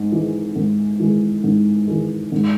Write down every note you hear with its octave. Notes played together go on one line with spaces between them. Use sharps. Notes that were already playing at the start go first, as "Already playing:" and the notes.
Already playing: G#2
E3 G#3
G#2
E3 G#3
G#2
E3 G#3
G#2